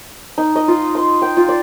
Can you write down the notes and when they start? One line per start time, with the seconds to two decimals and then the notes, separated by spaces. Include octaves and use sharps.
0.38 D#4
0.56 D#5
0.68 F4
0.95 C6
1.22 G5
1.37 F4
1.49 D5